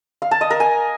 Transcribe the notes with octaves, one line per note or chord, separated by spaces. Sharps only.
F5
A5
D#5
A#4
G#5